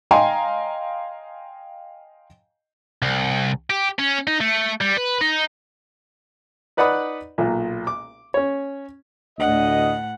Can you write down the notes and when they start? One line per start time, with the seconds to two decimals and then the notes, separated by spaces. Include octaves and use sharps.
0.11 D#5 F5 G5 G#5 A#5 C6
3.02 C2
3.70 G4
3.99 C#4
4.28 D#4
4.41 A3
4.81 G3
4.97 B4
5.21 D#4
6.77 D#4 B4 D5 F#5 B5 D#6
7.38 B1 A#2
7.87 D6
8.34 C#4 C#5
9.39 D2 A2 D#5 F#5